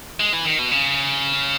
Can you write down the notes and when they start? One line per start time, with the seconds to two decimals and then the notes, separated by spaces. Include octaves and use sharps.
0.20 G#3
0.33 E3
0.45 D#3
0.59 B2
0.71 C#3